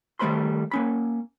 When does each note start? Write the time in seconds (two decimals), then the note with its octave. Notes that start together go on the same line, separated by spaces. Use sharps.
0.19 D#3 G3 A3 C5 B5 C6
0.71 A#3 C#4 B5